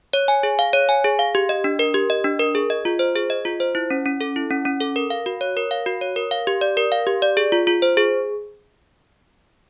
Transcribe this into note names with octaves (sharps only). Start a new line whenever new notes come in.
C#5
G#5
G#4
F5
C#5
G#5
G#4
F5
G4
D#5
D4
A#4
G4
D#5
D4
A#4
G#4
D#5
F4
C5
G#4
D#5
F4
C5
E4
C#4
C#4
A4
E4
C#4
C#4
A4
A#4
F5
F#4
C#5
A#4
F5
F#4
C#5
A#4
F5
G4
D5
A#4
F5
G4
D5
G#4
F4
F4
C5
G#4